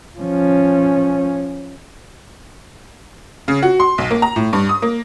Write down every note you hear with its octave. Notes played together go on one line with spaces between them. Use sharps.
F3 C#4
C#3
F#4
C6
B1
A#3
A#5
A2
G2
D#6
A#3